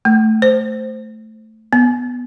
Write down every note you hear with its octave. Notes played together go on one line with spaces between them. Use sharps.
A3
C5
B3